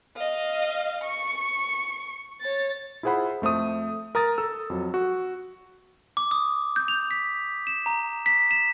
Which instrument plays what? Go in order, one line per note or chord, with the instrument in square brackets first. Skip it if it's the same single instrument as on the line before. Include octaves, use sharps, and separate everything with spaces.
[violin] D#5 F5
C#6
C#5 A6
[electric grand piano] E4 F4 G#4 C5 F#5 B5
F2 A3 C5 D#6
A#4 A#5 D#6 A6
A4 E6
F2 F#3
F#4
[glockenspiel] D6
D#6
G6
F7
B6
E7
A#5
B6
E7